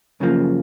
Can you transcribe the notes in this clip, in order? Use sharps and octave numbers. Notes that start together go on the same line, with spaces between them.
F#2 C#3 F3 A#3